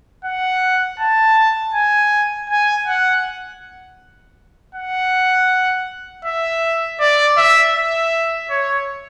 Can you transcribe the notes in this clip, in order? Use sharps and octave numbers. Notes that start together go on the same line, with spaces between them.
F#5
A5
G#5
G#5
F#5
F#5
E5
D5
E5
E5
C#5